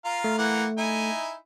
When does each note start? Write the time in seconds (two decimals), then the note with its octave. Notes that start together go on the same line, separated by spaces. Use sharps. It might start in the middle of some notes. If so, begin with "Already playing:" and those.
0.05 F4 A#4 F5
0.24 A3
0.38 E3 A#3 F#5
0.78 D#4 E4 G#5